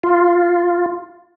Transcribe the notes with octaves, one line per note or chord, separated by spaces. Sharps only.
F4